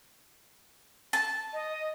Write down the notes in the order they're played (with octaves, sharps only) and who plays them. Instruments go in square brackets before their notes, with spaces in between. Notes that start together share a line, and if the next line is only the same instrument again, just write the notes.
[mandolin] A5
[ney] D#5